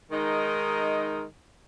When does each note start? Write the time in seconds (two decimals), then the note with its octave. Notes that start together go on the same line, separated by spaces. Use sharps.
0.11 D#3 G#3 D#4 A#4 D#5